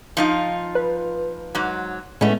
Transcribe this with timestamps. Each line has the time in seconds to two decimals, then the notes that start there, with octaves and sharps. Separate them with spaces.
0.17 F3 D#4 F4
0.75 B4
1.55 G#2 F#3
2.21 A2 G#3 A3 B3 C#4